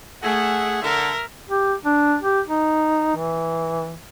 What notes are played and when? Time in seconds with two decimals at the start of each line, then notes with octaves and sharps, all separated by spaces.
0.23 A3 G#4 E5 F#5
0.82 D3 A4 A#4 E5
1.49 G4
1.85 D4
2.21 G4
2.48 D#4
3.16 E3